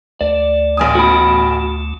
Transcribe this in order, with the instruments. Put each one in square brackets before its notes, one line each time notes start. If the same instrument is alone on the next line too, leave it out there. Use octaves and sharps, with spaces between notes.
[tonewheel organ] D2 A3 [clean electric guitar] D5
[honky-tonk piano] A1 G#5 D#6
[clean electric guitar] F#4 B5